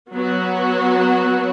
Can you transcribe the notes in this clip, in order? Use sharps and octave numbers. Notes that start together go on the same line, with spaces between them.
F#3 B3 F#4